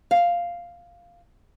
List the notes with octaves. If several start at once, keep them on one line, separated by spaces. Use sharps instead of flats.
F5